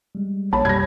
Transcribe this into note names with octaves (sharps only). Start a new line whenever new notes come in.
G3 G#3
A#1 A#3 C#5 A5 B5
F2 B2 G3 G#6 A#6